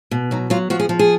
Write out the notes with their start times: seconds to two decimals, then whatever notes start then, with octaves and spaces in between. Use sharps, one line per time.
0.11 B2
0.31 F#3 D#4
0.50 F#3 F4
0.70 F3 F#4
0.80 G#4
0.89 F3
0.99 G#4